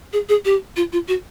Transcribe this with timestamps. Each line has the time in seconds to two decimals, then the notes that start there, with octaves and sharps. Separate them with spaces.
0.13 G#4
0.29 G#4
0.45 G4
0.76 F4
0.93 F4
1.08 F#4